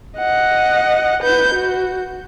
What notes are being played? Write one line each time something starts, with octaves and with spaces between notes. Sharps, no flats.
D#5 F#5
B4 G6
F#4